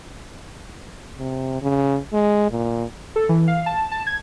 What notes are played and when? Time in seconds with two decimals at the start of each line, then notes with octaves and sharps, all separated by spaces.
1.18 C3
1.62 C#3
2.13 G#3
2.51 A#2
3.16 A4
3.29 E3
3.48 F5
3.66 A5
3.91 A5
4.07 G#6